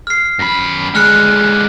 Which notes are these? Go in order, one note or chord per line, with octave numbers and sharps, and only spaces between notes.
F6 C7
F#2 B5
D3 G#3 F6 F#6 C#7